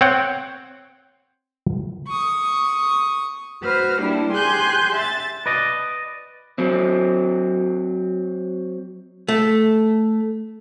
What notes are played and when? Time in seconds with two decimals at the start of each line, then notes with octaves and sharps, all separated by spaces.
0.01 C4 C#5 F#5 G5
2.08 C#6 D#6
3.63 F#4 B4 C5 F6
4.01 G3 A#3 D4 E4
4.32 G4 G#4 G#5 C6 F#6 G6
4.94 E5 A6
5.46 B4 D5 D#5
6.58 F#3 C4
9.28 A3